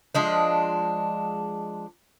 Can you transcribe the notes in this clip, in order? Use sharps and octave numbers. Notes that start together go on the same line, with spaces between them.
F3 G#3 D4